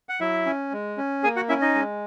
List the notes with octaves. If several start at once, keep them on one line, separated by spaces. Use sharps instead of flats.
F#5
F#3 E4 E5
C#4
G#3
C#4
A#3 G#4 G#5
F#4 F#5
C#4 E4 E5
D#4 D#5
G#3